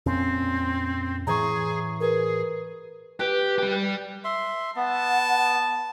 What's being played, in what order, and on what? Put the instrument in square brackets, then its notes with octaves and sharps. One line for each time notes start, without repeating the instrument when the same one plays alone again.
[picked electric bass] F2 A#2 C#4 [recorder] C4
[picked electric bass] A2 E3 [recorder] G#4 [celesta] A#5 C#6
[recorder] G#4 [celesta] A#4 B4
[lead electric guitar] G4 [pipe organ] B4
[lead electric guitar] G3 G4
[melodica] E5 C6
[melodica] B3 [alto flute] F#5 [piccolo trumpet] A5